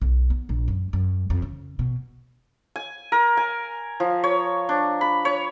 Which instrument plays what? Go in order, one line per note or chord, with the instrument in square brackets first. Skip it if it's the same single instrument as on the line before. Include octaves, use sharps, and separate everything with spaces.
[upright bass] B1
B3
A#1
F#2
F#2
F2
C#3
B2
[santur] G#5
A#4
G#5
F3
C#5
D4
B5
C#5